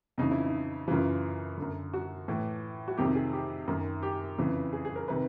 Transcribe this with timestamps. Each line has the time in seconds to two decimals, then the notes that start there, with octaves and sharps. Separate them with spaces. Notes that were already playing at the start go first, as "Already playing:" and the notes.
0.18 F2 C#3 E3 D#4
0.31 E4
0.44 D#4
0.88 F#2 C#3 E3 F4
1.57 F#2 D3
1.94 F#4
2.28 A2 E3
2.88 F#4
2.97 F2 C3 D#3 G4
3.15 G#4
3.33 G4
3.68 F#2 D#3
4.03 G4
4.38 F2 C#3 E3
4.73 G#4
4.85 G#4
4.96 A#4
5.08 C3 D#3 B4